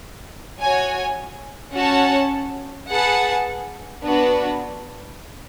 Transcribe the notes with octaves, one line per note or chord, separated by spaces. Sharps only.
F#4 C#5 G#5
C#4 F#4 C#5 F#5 A5
G#4 B4 F#5 A5
B3 D4 F#4 B4